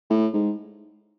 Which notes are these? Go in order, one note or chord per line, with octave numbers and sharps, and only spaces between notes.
A2
G#2